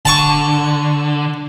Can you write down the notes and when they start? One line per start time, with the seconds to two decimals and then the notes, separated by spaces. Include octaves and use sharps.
0.05 D3 A5 C#6